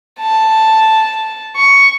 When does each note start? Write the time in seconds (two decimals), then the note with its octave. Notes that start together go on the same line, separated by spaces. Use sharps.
0.20 A5
1.56 C#6